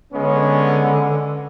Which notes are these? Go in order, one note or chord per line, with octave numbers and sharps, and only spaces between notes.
D3 G#3 B3 C#4